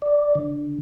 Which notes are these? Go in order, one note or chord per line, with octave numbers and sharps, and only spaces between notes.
D5
D3